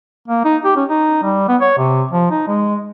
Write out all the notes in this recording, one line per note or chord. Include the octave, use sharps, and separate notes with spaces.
A#3
D#4
G4
C#4
D#4
G3
B3
C#5
C3
F3
D#4
G#3